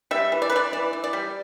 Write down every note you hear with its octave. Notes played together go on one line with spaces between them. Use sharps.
G3 E5
E3
D5
B4
E3 D5
E3 D5
E3
D5
G3